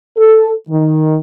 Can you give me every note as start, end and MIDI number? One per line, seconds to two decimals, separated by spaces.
0.17 0.49 69
0.69 1.16 51